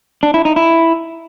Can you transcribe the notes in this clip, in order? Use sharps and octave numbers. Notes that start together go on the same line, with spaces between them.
D4
E4
D#4
E4